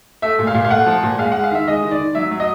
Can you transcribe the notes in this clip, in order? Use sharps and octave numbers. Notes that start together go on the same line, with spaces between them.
A3 E5
A#2
F5
A#2
F5
A3 F#5
F3
A#2
G#3 F5
G#3 F#5
F5
D#3 E5
G#3 D#5
D#3
D5
D#3
F#3 E5
F#3
D#5